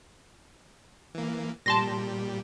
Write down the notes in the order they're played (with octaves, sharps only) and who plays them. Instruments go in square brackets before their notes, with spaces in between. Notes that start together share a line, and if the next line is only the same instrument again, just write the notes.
[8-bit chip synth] E3 A#3
[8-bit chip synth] A#2 G3 G4 [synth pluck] A5 C6 A#6